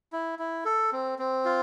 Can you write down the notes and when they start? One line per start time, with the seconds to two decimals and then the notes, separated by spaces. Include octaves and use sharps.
0.12 E4
0.39 E4
0.65 A4
0.93 C4
1.19 C4
1.45 F4